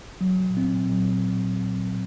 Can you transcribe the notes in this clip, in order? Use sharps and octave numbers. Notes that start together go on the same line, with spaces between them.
F#3
A#2
C4
A#2
F#3